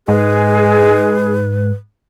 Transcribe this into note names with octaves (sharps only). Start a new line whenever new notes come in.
G#2 G#3 G#4 B4